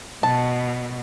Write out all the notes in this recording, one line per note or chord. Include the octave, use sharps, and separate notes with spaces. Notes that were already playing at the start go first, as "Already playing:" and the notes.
B2 A5